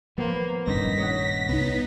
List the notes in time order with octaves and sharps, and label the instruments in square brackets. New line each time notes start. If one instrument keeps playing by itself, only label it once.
[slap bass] F3 [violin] A#3 [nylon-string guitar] B3 C5
[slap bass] D#1 G2 C#4 [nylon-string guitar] D#4 [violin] A#6 B6
[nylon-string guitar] C#5 D#5 F#5
[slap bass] C2 [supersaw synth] B3 D#4